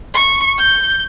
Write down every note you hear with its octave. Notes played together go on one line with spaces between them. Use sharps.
C#6
G6